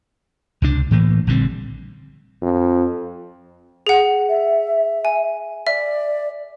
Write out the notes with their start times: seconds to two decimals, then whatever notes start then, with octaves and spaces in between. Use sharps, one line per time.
0.62 C#2 C3 D4
0.91 A2 E3 A3 A#3
1.27 A#1 D3 G3 C4
2.43 F2
3.87 G#4 F#5
4.29 E5
5.05 G#5
5.67 D5 E5